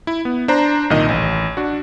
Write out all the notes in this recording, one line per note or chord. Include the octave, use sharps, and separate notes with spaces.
E4
B3
D4 C5 A#5
C2 A#2 D#3 D#5
A1
D4 F#4